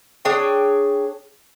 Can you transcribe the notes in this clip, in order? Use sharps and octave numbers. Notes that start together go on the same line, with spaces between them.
D4 G#4 C#5 G5